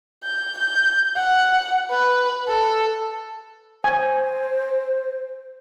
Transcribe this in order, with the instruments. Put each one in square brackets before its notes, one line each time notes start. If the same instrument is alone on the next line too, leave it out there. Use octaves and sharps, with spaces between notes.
[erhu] G6
G6
F#5
B4
A4
[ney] C5 [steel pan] G#5